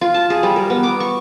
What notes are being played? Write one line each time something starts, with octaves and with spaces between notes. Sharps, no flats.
F4
A5
G#4
G3
A#4
B3
D6
C#6